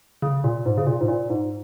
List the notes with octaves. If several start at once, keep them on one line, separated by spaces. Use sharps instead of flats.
C#3
A#2
G#2
C#3
A#2
G#2
A#2
G#2